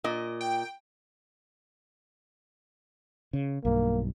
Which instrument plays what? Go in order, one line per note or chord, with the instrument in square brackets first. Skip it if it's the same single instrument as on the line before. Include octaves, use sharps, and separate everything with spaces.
[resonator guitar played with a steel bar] A#2 D#5
[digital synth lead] G5
[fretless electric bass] C#3
[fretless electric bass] B1 G2 [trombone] A#3